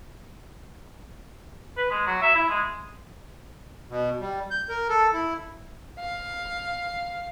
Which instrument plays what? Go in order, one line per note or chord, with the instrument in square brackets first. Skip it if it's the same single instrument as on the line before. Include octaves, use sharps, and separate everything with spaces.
[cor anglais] B4
G#3
F#3
E5
E4
G#3
[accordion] B2
G3
G6
A#4
A4
E4
[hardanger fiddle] F5